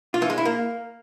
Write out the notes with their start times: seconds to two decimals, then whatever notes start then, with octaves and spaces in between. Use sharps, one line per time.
0.14 F4
0.22 E3
0.30 G#3
0.38 E4
0.45 A#3